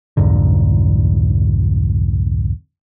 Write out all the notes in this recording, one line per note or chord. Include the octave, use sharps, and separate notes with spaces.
C2 F2 G#2 D3